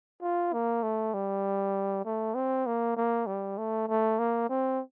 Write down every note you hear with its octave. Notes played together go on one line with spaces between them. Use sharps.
F4
A#3
A3
G3
A3
C4
A#3
A#3
G3
A3
A3
A#3
C4